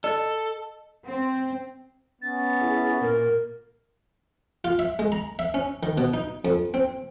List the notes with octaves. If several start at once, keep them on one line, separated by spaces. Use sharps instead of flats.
A4 D#5
C4
B3 C#4 A6
E4 G#4
A#2 A#4
F4
E5
G#3
A#5
E5
C#4
D#3
B2
D#4
F2
C4